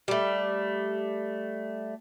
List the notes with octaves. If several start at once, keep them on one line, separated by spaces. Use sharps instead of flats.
G3 A3